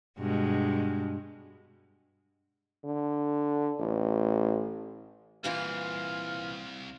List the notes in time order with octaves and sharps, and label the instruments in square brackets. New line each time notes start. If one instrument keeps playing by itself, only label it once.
[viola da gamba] G2 B2 G#3
[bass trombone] D3
A1
[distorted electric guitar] C2 [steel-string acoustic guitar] A#2 E3 F4 [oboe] F5